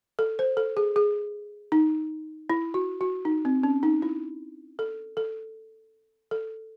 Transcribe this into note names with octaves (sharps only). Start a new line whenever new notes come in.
A4
C5
A4
G#4
G#4
D#4
E4
F#4
F#4
D#4
C4
C#4
D#4
E4
A4
A4
A4